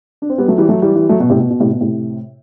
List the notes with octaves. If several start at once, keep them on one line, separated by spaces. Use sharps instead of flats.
D4
C4
G3 B3
F#3 A3
E3 G3
F#3 A3
E3 G3
E3 G3
F#3 A3
B2
A2 C3
B2
B2
A2 C3
B2
A2 C3